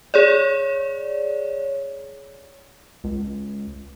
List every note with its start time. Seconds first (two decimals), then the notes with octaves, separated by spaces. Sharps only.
0.14 G#4 C#5 D5
3.04 C#2